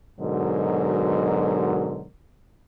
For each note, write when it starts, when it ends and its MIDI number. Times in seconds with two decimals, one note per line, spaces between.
0.20 2.08 44
0.20 2.08 47
0.20 2.08 50
0.20 2.08 54
0.20 2.08 70